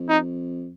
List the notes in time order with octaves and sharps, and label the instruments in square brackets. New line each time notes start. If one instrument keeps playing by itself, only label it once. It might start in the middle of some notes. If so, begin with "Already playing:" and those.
Already playing: [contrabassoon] F2
[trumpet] D#4